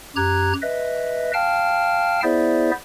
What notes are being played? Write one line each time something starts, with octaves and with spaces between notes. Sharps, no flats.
F#2 G4 A#5 F#6 G#6
B4 D#5 E5
F5 G5 A5 F6
B3 E4 G#4 C5 D5 E5